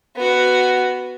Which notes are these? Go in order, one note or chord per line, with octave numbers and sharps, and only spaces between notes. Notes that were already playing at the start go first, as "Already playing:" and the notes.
B3 F#4